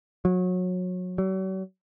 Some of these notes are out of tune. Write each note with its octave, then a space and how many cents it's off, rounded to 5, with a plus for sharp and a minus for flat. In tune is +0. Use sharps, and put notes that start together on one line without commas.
F#3 -25
F#3 +45